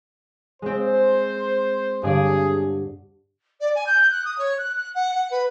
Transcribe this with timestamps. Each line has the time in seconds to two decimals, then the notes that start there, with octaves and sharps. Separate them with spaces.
0.62 G#3 C4 C5
2.03 G2 D3 G#4 D5
3.60 D5
3.75 G#5
3.86 G6
4.11 F#6
4.24 D#6
4.38 C#5
4.58 F#6
4.76 F#6
4.95 F#5
5.14 F#5
5.30 B4